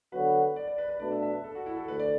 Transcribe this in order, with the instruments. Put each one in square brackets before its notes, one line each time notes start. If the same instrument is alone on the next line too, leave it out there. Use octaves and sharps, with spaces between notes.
[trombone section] D3 F#3 B3 F#4 [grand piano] B4
[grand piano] D5
D5
B4
B4
[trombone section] B2 A3 D4 [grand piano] D5
[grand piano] E5
E5
B4
A4
F#4
E4
A4
[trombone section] D2 [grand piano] B4
[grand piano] D5